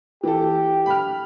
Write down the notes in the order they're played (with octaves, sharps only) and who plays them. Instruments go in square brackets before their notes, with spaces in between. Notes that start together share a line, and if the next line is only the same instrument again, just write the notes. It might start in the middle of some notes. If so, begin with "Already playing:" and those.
[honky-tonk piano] E3 A4 [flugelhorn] G4
[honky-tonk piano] B5 F6